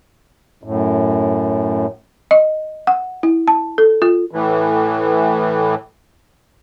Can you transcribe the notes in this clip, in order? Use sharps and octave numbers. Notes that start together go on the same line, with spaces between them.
F#2 A2
D#5
F#5
E4
A5
A4
F4
A2 E3